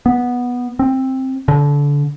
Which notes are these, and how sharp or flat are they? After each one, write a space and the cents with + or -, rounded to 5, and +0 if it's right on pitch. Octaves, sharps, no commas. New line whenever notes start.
B3 -10
C4 +10
D3 -30